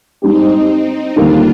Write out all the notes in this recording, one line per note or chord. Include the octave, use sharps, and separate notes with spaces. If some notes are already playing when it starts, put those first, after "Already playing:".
G#2 G3 C4 D4 D#4 G4
D#2 D3 G3 A#3 D4 F4